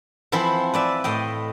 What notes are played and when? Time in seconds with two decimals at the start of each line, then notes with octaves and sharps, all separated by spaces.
0.32 E3 F3 C4 E4 B5 C6
0.74 B4 D5 E5
1.04 A2 D#5 G5